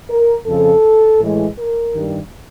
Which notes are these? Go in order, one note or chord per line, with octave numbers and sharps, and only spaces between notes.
A#4
F2 C#3 F3 A4
A2 E3 G#3
A#4
G2 D#3 G3